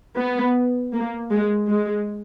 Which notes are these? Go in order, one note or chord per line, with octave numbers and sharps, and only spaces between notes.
B3
A#3
G#3
G#3